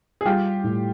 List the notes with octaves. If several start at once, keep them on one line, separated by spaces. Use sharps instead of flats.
G#4
G3 F4 G4
A2